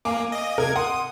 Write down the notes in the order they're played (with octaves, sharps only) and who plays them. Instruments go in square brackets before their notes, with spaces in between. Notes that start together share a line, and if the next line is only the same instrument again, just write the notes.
[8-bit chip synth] A#3 [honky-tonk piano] F5 G#5 D6
[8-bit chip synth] D#5
[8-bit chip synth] C3 G#6 [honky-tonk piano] A#4
[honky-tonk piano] F#5 C6 [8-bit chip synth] D#6